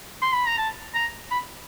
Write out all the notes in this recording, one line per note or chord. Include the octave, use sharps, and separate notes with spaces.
C6
B5
A#5
A5
A#5
B5